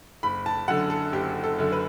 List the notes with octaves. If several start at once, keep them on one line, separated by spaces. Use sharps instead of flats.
F#1 B5
A5
F#2 D3 F#5
A4
F#1 G4
A4
F#2 D3
B4